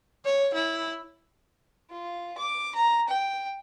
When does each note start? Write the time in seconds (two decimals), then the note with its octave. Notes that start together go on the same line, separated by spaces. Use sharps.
0.25 C#5
0.54 E4
1.91 F4
2.38 D6
2.75 A#5
3.08 G5